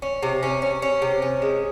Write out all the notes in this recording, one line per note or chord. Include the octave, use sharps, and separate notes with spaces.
C#4
C3
C#4
C#4
C#4
C3
C#4
G#3